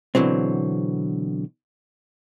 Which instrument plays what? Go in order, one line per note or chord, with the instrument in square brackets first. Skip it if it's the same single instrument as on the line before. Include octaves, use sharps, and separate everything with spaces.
[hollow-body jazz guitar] B2 D3 E3 F#3 C4